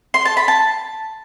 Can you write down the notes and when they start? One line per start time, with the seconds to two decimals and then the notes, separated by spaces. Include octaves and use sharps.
0.14 C6
0.25 A5
0.37 B5
0.48 A5